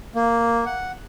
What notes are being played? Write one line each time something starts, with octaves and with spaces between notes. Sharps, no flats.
A#3
F#5